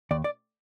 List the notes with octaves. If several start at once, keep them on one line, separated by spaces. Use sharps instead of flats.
D#2 D5
D5